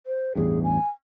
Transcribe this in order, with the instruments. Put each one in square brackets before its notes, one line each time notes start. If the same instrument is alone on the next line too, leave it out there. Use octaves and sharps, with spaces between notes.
[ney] C5
[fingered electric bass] A1 E2 G2 [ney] G#4
[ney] G#5